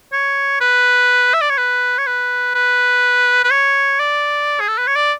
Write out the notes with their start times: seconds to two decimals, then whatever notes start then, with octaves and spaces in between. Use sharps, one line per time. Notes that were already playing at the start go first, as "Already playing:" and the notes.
0.13 C#5
0.61 B4
1.34 E5
1.41 D5
1.50 C#5
1.58 B4
1.98 C#5
2.07 B4
2.55 B4
3.44 B4
3.51 C#5
4.00 D5
4.60 G#4
4.68 A4
4.78 B4
4.87 C#5
4.96 D5